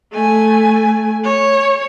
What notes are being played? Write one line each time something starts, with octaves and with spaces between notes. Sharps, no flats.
A3 G#5
C#5